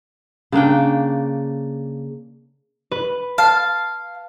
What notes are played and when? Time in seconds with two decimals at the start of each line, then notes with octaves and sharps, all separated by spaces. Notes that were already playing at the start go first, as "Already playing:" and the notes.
0.52 C#3 A#3 D4 G5
2.91 B4
3.38 F5 A5